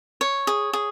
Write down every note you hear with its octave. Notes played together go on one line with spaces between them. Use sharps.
C#5
G#4
G#4